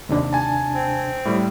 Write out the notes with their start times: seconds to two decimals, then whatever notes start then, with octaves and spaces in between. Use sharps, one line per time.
0.09 D#2 C3 D4
0.33 G#5 A5
0.74 C4
1.25 A2 G3